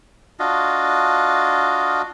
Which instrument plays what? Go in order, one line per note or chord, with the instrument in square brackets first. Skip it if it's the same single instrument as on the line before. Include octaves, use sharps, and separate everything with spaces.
[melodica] D4 F4 F#4 D#5